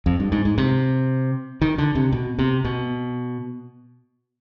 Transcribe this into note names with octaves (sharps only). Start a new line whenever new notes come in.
F2
G2
G#2
G#2
C3
D#3
D3
C3
B2
C3
B2